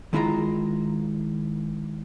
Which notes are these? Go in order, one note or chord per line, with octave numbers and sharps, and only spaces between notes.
D#3 G#3 E4 F4 E5 A#5